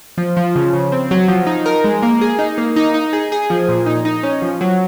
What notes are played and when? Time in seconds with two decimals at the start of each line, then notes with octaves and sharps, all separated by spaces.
0.18 F3
0.37 F3
0.56 C#3
0.73 C#3
0.92 C4
1.11 F#3
1.28 F3
1.47 D#4
1.66 A#4
1.84 G#3
2.03 A#3
2.21 G#4
2.39 D#4
2.58 A#3
2.76 D#4
2.94 D#4
3.13 G#4
3.32 G#4
3.50 F3
3.69 A#2
3.86 D#4
4.05 D#4
4.23 C#4
4.42 F3
4.61 F#3